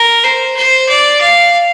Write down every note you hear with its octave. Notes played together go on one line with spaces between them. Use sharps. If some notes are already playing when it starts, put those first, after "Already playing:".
Already playing: A#4
C5
C5
D5
F5